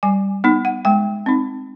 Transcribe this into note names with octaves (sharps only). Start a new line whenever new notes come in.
G3 G#5
B3 D#4
F#5
G#3 G5
C4 D#4